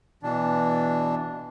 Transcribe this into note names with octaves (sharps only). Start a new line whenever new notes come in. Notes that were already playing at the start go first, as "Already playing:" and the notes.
B2 E3 D4